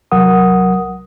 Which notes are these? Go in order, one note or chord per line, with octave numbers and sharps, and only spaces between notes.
C2 F#3 A#4 F#5 D#6